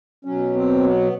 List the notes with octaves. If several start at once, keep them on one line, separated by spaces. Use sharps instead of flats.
B2 F#3 C#4
C4
B3